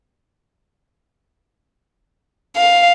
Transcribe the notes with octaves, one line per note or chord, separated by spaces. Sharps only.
F5